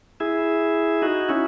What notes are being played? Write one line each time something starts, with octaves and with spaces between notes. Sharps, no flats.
E4 G#4
D#4 F#4
C#4 E4